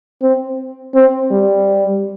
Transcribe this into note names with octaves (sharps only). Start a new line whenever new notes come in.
C4
C4
G3